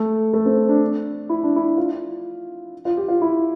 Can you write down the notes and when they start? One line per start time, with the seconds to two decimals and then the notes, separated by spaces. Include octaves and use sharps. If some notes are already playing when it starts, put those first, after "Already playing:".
Already playing: A3
0.33 A3
0.46 C4
0.69 D4
1.29 E4
1.43 D4
1.56 E4
1.77 F4
2.85 F4
2.97 G4
3.08 F4
3.22 E4